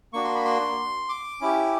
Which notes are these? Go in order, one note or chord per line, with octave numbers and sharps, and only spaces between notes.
A#3 D4 F#4 C#6
C6
B5
C6
D6
C#4 E4 G4